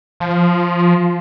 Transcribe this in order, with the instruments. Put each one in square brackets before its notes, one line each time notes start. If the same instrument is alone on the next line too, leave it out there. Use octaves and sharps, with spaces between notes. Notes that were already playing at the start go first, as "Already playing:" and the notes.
[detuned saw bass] F3